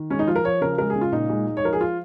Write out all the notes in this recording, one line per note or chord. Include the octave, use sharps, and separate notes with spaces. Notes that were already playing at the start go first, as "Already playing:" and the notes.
Already playing: D#3
G#3 C#4
D#4
F3 F4
A#4
F3 C#5
C#3 A#4
G#3 A#4
G#4
C#3
F4
A#2 D#4
G#3
G#3
C#5
F3 A#4
G#4
F4